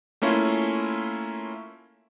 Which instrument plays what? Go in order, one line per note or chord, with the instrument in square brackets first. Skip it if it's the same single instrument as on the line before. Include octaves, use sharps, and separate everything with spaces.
[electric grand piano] A3 A#3 C#4 E4 F4